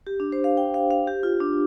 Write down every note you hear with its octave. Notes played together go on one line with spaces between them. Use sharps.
G4
D4
C5
F5
G5
F5
F5
G4
F4
D4